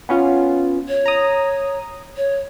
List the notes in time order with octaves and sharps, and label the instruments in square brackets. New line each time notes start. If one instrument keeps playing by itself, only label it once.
[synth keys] B3 C#4 F4
[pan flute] C#5
[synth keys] A#5 D#6
[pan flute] C#5